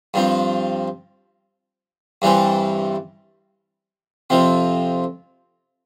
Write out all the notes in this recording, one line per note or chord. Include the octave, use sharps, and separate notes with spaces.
G2 F3 C4
G2 E3 G3 C4
F2 C3 F3 C4